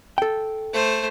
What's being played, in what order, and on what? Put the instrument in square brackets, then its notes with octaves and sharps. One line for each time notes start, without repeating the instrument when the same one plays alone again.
[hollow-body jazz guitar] A4 G5
[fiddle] A3 C5